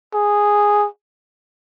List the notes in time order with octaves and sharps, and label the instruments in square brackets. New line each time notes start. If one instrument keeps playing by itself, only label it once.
[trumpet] G#4